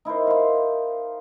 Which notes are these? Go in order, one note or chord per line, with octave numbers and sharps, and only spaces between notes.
D#4 E4 A#4 C5
F5 C6